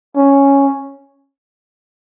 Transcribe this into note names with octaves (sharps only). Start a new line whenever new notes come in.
C#4